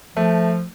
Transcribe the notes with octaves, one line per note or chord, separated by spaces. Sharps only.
F3 A3